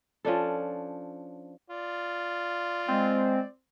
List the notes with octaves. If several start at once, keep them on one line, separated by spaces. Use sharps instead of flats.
F3 C#4 D4 A4
F4 D5
G#3 C4